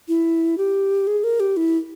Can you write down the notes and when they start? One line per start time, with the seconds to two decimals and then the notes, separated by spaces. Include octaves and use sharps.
0.08 E4
0.58 G4
1.07 G#4
1.24 A#4
1.40 G4
1.57 E4